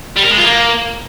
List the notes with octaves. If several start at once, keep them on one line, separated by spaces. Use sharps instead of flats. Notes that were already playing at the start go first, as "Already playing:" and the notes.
G3
A#4
G#3
F4
A#3